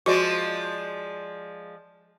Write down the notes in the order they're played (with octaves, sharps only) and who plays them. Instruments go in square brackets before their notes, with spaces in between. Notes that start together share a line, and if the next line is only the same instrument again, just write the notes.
[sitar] F3 G#3 D5 [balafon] F#4